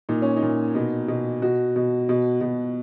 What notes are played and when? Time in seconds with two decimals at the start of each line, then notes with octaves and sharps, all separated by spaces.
0.09 A#2 D#4
0.22 C#4
0.37 D#4
0.42 A#2
0.75 B2
1.08 B2
1.42 B2 F#4
1.76 B2
2.09 B2
2.41 B2